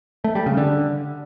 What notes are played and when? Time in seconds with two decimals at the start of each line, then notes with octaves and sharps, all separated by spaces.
0.24 A3
0.35 G3
0.46 C#3
0.57 D3